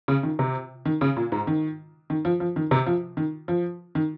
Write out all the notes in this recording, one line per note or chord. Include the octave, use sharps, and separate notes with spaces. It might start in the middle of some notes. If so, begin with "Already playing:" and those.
C#3
D#3
C3
D#3
C#3
A#2
G#2
D#3
D#3
F3
F3
D#3
C3
F3
D#3
F3
D#3